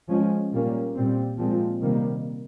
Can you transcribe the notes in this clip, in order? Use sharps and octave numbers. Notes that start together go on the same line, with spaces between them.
F3 G#3 C#4
A#2 G3 A#3 C#4
A#2 G3 C4
A#2 F3 G#3 C4
C3 D#3 G3 A#3